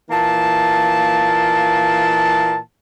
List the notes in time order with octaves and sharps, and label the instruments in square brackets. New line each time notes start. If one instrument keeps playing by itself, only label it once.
[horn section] A#2 E3 A#3 A5